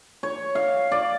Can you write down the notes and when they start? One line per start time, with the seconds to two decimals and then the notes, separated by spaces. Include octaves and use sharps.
0.23 C#5
0.55 F5
0.92 D5